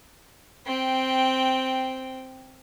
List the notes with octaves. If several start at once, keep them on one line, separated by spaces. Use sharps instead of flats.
C4 G5